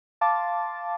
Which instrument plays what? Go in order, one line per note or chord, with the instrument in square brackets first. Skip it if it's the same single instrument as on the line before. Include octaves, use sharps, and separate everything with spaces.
[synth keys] F5 A5 C6 D6 A6